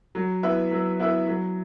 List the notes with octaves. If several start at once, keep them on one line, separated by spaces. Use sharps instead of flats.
F#3
B3 E4 B4 E5
F#3
B3 E4 B4 E5
F#3